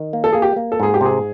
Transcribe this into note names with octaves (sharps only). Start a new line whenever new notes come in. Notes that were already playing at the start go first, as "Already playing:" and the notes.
Already playing: D#3
A#3
A4
A#3 G#4
G4
A#3
A4
G#2 G#4
G4
C3 G#4